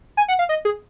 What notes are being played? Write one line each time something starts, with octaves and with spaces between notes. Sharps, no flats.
G#5
F#5
F5
D#5
G#4